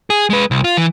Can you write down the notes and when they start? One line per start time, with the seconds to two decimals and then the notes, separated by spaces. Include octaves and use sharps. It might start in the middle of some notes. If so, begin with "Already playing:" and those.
0.10 G#4
0.30 G#3 B4
0.51 C2
0.64 F4
0.77 E3